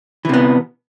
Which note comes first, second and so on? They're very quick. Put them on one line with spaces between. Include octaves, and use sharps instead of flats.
E3 C3 B3